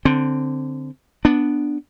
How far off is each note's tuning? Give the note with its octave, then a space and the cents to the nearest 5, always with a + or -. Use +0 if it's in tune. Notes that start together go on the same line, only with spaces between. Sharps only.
D3 +0 C4 +0
B3 +0 D4 +0